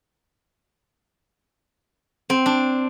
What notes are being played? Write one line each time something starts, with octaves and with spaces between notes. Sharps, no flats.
C4
D4